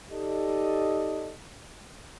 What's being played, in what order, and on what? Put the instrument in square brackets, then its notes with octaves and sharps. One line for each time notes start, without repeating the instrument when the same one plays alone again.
[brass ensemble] D#4 G4 A4 D5 D#5